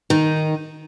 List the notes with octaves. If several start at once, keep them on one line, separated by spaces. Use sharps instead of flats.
D#3 D#4